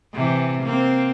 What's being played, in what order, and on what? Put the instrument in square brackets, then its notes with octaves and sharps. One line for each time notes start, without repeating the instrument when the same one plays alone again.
[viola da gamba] C3 E3
A#3 C4